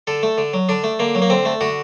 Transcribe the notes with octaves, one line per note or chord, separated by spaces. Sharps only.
D3 A4
A3
D3
F#3
D3 D4
A3
D3 A#3
F#3
A#3
D3 C4
A3
D3 F#4